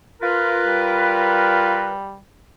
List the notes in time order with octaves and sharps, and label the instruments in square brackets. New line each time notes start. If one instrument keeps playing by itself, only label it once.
[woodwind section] F4 A#4 B4
[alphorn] G3